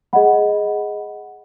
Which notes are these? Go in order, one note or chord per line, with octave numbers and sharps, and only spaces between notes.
G#4 D#5 F#5 B5